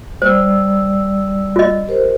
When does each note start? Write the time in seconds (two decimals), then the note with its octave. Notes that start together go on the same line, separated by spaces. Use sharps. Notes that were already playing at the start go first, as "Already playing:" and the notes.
0.22 G3 C5 D5 E6
1.56 F4 D#5
1.88 G4 A#4 C5